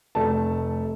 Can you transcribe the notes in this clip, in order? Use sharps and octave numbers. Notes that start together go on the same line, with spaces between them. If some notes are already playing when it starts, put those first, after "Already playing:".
F1 A3 A5